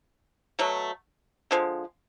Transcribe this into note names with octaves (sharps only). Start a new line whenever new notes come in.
B2 F#3 A3
D3 F3 G#3